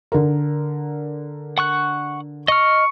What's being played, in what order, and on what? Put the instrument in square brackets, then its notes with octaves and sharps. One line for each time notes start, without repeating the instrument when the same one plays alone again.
[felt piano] D3 A#4
[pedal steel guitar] F#5 C#6 F#6
[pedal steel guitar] D#5 F6 [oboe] C#6